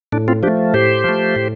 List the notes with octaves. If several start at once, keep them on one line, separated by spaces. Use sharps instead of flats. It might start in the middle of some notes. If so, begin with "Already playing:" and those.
A2 D4
C4 F4
F3 A3 D4 G4
A2 G4 C5
F3 A3
A2